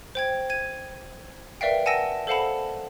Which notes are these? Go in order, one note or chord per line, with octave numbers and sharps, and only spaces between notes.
C5 G5 G#6
G#6 D#7
A#4 B4 D5 E5 F5 G5
F#5 G#5 A5 E6 A#6 D7
A4 C5 F5 F#5 A5 B5